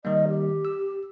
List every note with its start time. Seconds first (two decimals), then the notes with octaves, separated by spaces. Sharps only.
0.05 D#3 G3 A#3 D#5
0.28 G4
0.65 E6